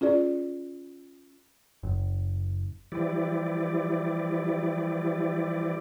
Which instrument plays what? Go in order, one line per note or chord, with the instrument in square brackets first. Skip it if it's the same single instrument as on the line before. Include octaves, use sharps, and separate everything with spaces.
[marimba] C#4 F4 G#4 D5
[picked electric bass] F#1
[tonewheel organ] E3 F3 G3 E4 G4 D5